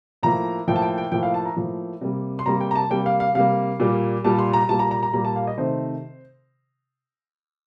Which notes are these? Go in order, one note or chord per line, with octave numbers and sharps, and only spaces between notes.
A2 F3 A#3 A#5
A2 F3 A#3 G5
A5
G5
G5
A2 F3 A#3 G5
F5
A5
A#5
A2 F3 A#3
C3 G3 A#3
C6
C3 G3 A#3 A#5
G5
A#5
A5
C3 G3 A#3 G5
F5
F5
C3 G3 A#3 F5
A#2 G3 A#3
A#2 G3 A#3 A5
C6
A#5
A#2 G3 A#3 A5
A#5
A#5
A#5
A#2 G3 A#3 A#5
A5
F5
D#5
C3 D#3 A3 C5